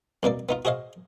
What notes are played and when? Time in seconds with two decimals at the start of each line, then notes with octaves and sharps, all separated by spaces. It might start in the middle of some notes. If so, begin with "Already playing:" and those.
0.23 C2 B2 A#3 D5
0.49 B3 D#4 F4
0.65 F#4 G#4 C5 D#5 F5